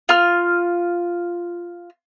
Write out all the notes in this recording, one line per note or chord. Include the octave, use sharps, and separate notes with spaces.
F4 F6